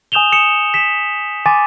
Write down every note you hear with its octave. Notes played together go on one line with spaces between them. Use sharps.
G#5 D#6 G6 E7 F7 G7
D#6 C#7 E7
B6 E7
G#5 C6 D6 A6 D#7